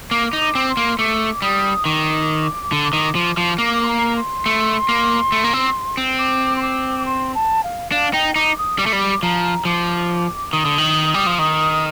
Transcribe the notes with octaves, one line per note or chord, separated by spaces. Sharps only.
A#3 D6
D#4
D6
C4
C6
A#3
A3 D6
G3 D#6
D#3 D6
D3
D#3
F3
F3
A#3 D6
C6
A#5
C6
A3
A#3
A3
A#3
C4
C4
D6
C6
D6
C6
A5
F5
D4 F5
D#4 G5
D#4 D6
D#6
G3 D6
A3
G3
F3 A#5
F3 D6
D#3 D#6
D3
D#3
G3
F3
D#3 D#6